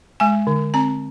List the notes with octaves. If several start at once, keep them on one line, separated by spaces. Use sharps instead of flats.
G#3 G#5
D3
C4 A#5